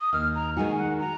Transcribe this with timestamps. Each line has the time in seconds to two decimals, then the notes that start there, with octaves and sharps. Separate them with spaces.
0.01 D#6
0.13 D#2 F6
0.35 A#5
0.57 D#3 G#3 D#4 F#4 G#5
0.78 F#5
1.00 A#5